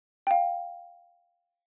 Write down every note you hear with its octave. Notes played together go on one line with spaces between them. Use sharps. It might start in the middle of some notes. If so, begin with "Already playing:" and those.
G5
F5